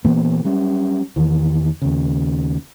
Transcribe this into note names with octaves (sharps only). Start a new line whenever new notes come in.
A#2 E3 A#3 B3
F#3 G3 C#4
E2 D#3 E3
D#2 C#3